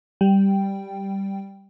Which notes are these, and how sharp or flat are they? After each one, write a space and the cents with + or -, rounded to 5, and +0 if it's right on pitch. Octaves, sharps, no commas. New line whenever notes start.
G3 +0 G5 +0